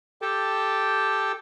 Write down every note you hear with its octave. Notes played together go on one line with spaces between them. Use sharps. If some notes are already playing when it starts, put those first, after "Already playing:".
G4 A4 G5 A5